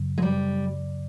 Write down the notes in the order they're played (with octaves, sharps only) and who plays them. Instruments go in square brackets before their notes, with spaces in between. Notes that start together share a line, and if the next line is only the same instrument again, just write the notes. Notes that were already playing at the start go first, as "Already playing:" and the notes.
Already playing: [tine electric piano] F#2 C#3 F#3
[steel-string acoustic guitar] G#3
G3